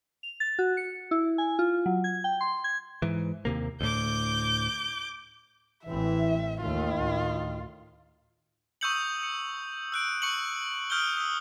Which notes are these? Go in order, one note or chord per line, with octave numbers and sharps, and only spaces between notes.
F7
A6
F#4
C#7
E4
G#5
F4
F#3
G#6
G5
C6
G#6
G#2 E3
D#2 C3 A#3
D2 A2 D6 G6
A1 E3 C4 E5
D#2 D#3 A3 F4
D2 A2
C#6 D#6 E6 G6 C#7 F#7
C#7
E6 F#6 D7
C#6 C#7 D#7 F#7
D#6 F6 G6 D7 F#7 G7
D#6 E6